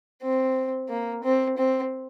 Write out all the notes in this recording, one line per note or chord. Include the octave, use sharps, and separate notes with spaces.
C4
A#3
C4
C4